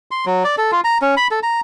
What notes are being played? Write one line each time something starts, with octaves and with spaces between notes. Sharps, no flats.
C6
F#3
D5
A4
F4
A#5
C#4
B5
A4
A#5